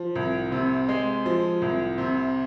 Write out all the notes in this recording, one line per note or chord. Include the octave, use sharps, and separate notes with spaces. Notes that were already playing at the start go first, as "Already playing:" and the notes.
Already playing: F3
C2
C3
G#3
F3
C2
C3